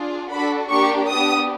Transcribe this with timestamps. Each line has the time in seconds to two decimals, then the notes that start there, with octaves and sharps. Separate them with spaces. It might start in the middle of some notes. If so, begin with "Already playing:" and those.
Already playing: D4 F4 G#4
0.31 D4 F#4 A4 B5
0.70 A#3 D4 G4 C#6
1.09 B3 D4 G4 D#6